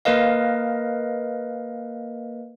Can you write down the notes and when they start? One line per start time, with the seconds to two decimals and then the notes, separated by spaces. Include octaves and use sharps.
0.05 A#3 A#4 B4 D#5 F5